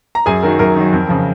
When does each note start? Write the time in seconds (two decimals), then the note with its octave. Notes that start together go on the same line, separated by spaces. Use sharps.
0.15 A#5
0.26 F#2 G#4 G#5
0.43 D#3 F#3 A#4
0.59 F#2 A#4
0.75 D#3 F#3
0.93 F2
1.08 C#3 F3